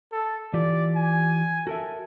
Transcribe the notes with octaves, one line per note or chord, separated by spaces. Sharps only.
A4
E3 F4 G4 D5
G#5
F#4 A4 A#4 E5